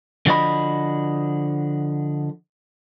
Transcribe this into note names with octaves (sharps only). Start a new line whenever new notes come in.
D3 F3 F#4 D5 D#5 B5